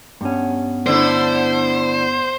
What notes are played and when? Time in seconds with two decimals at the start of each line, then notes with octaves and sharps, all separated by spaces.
0.21 G2 B3 C#4
0.87 D3 A3 E4 C5